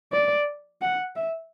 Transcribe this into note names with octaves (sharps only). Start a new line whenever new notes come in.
D5
F#5
E5